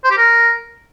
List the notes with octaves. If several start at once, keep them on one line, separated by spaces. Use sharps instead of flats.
C5
G4
A#4